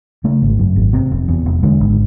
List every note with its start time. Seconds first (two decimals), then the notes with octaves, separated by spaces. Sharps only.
0.24 C#3 A3
0.42 G#1
0.59 F#2
0.76 G#1
0.93 C3
1.11 F1
1.28 E2
1.46 F1
1.63 D3 G#3
1.81 G#1